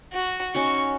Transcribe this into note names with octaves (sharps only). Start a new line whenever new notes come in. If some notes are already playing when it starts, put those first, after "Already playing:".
F#4
C#4 D#4 F#4 C#6